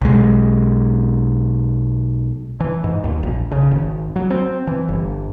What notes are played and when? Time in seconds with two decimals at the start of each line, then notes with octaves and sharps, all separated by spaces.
0.02 B1 G#3
2.60 E3
2.84 G#2
3.04 D#2
3.23 A#1
3.51 C#3
3.71 G#1
4.16 F#3
4.30 C4
4.67 E3
4.88 G1